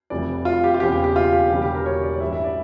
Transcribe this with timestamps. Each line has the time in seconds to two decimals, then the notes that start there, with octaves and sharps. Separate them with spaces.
0.10 F1 F2 E3 G3 D5
0.45 F4
0.64 G4
0.74 F4
0.80 E1 E2 C#3 G4
0.92 G4
1.04 G4
1.16 F4
1.33 G4
1.50 E1 E2 D3 G3 G4
1.62 G4
1.75 A#4
1.86 C#5
2.03 D5
2.14 D5
2.20 A1 G2 E3 G3 E5
2.32 E5
2.44 D5